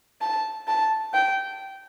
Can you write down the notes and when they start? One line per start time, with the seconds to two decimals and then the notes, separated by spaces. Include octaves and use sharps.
0.21 A5
0.68 A5
1.14 G5